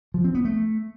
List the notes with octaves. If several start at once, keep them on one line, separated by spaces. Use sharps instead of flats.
F3
C4
B3
A3